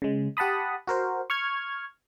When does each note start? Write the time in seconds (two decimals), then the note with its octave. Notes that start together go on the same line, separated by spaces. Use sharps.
0.02 C#3 G#3
0.37 G4 F#5 A5 B5 D#6
0.87 F#4 A#4 C5
1.30 C#6 F6 G#6